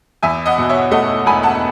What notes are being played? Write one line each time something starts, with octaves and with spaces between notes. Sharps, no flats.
E2 E5 G#5
D#5 F#5
B2
C#5 E5
A3 D#5 F#5
E1 G#5 B5
F#5 A5